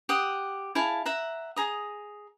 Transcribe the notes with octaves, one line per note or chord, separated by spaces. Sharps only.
G4 F#5 D#6
E4 G#4 F5 A5
E5 F#5 A#5
G#4 A#5 D#6